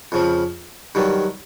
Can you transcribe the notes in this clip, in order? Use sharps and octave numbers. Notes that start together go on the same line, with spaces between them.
F2 C#3 F3
G2 D#3 F#3